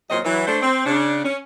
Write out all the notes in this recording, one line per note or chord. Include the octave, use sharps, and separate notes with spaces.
E2 A#2 F#3 C4 C5 D#5
E3 F#3
A3 D4 C5
C4
C#3 D4
C#4